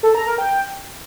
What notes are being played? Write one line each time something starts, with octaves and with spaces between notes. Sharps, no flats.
A4
A#5
A#4
G5